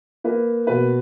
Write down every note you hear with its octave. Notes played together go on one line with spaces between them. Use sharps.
A#3 B4
B2 B4